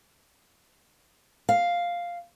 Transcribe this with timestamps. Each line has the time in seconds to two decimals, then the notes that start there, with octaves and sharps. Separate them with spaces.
1.49 F5